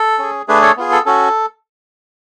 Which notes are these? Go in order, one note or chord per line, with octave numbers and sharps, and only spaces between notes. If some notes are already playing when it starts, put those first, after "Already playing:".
Already playing: A4
C#4 G#4
A3 D4 G#4 B4
A4 C#5
B3 F4 G#4
A4
C#4 F#4 A4